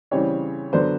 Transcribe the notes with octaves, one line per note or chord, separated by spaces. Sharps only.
C#3 E3 G3 C4 C#5
D3 F#3 B3 D4 C5